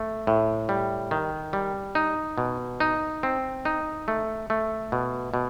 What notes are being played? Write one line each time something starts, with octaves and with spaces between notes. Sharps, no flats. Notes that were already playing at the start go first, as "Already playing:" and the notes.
Already playing: A3
A2
G3
D#3
G3
D#4
B2
D#4
C4
D#4
A3
A3
B2
B2